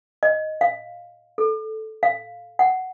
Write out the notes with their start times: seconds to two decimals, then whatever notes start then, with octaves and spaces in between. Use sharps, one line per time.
0.23 D#5
0.61 F5
1.38 A4
2.03 F5
2.59 F#5